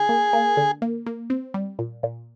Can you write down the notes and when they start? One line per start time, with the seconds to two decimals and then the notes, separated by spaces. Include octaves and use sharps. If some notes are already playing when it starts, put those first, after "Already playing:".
Already playing: D3 G#4
0.09 A#3
0.33 A#3
0.57 D3
0.82 A#3
1.07 A#3
1.30 C4
1.54 G3
1.79 A#2
2.03 A#2